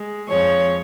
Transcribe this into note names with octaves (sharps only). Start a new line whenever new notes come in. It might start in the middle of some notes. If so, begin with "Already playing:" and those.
Already playing: G#3
F2 F3 G#3 C#5